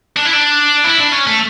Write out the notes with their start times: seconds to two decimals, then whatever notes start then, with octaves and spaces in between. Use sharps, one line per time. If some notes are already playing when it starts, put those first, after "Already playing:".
0.17 D4
0.25 E4
0.33 D4
0.84 E4
0.97 D4
1.12 C#4
1.27 A3